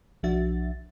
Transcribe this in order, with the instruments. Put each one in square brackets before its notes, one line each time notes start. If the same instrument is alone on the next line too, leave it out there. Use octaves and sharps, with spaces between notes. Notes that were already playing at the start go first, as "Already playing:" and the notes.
[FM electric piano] B1 F3 D4 F#4 E5 A6